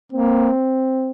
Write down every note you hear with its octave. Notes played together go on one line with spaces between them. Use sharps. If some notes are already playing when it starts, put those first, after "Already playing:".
A#3 C4